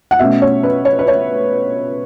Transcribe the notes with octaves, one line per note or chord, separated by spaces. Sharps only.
F#5
B2 A3 C#4 E5
C#5
B4
C#5
B4
C#5